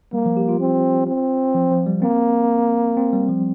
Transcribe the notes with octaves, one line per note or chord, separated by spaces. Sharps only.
G3 A#3
F3
G4
F4
C4
C4
F3
F3
G3
A#3 C4
C4
G3
F3